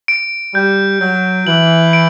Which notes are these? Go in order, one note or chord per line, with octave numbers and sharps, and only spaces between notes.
D7
G3 G6
F#3 G6
E3 F#7
D7